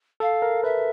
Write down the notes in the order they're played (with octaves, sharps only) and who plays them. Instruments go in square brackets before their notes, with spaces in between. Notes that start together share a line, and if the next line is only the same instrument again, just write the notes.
[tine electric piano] A4 [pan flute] F5
[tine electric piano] A#4
[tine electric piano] B4 [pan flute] E5